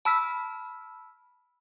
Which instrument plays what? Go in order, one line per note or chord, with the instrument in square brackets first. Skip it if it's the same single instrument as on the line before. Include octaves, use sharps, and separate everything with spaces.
[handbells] A5 B5 E6 F6 B6